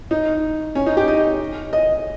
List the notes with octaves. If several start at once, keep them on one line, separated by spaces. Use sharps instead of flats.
D#4
C#4
D#4
G4
D#5
D#5